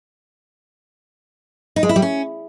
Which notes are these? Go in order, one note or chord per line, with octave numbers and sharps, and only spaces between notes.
D#4
G#3
E4
G3
C#4